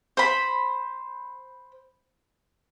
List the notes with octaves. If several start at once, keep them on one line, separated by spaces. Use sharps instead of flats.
C5 B5